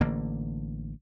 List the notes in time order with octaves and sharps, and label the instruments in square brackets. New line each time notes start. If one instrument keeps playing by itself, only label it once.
[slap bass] A1 D3 A#3